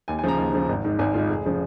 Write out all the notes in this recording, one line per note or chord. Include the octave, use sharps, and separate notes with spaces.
D#2 G#5
G#5
C#3 F3 A#5
D#2
C#3 F3
G#1
G#2 D#3
G#1 G#5
G#2 D#3 F4
F1 G#4
C#3 F3